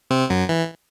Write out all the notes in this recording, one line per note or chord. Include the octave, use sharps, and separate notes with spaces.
C3 C4
F#2 F#3
E3